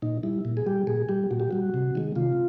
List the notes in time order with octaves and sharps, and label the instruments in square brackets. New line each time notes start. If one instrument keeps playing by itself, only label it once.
[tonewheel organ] A#2 D#4
G3 E4
A#2
G#4
G3 G4
A#2 G#4
G3 G4
A#2 F#4
G4
G3 F#4
C3
D#3 G#3
C3 F4